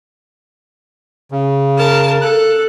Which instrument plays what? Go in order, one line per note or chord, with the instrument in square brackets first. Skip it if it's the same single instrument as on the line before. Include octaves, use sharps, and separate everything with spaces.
[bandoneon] C#3
[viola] A#4 A5
[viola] A4 [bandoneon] F#6